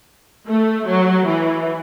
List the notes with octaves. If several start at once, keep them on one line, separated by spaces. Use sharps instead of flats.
A3
F#3
E3